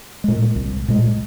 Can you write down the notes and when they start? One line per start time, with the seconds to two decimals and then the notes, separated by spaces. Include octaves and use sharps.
0.24 A#2 G#3
0.56 C2
0.88 A#2 G#3